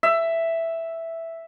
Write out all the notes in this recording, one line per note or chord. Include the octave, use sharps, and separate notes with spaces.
E5